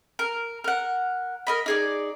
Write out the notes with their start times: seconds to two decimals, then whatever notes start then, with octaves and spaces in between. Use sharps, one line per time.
0.19 A#4
0.64 A#4 F#5
1.47 A#4 D#5 B5
1.66 D#4 G#4 D5